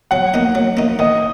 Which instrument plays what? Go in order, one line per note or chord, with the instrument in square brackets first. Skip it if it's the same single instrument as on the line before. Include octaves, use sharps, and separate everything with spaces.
[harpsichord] F#3 [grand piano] F#5
[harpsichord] A#3 D#4
F#3
A#3 D#4
[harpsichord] D#3 [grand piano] D#5